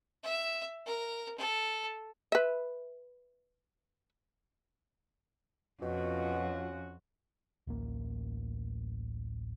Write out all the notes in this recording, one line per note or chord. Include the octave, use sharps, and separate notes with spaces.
E5
A#4
A4
B4 E5
F2 B2 C#4 F4 F#4
D1 A1 A#3